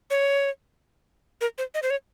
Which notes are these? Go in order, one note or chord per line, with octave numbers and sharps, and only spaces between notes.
C#5
A#4
C5
D#5
C5
C#5